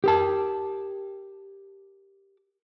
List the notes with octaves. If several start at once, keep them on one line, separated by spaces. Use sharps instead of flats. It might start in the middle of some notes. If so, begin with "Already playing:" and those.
G4 A#4 A5